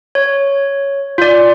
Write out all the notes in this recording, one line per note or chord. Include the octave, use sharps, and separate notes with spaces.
C#5
F4 D5